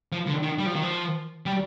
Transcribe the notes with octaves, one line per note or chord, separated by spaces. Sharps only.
F3
D3
D#3
G3
F3
D#3
F3
G3